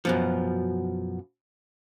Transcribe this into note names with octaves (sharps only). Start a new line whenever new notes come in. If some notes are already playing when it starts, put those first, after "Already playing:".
F#2 B2 F3